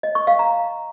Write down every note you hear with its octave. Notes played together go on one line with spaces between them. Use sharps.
D#5
C#6
F5
A#5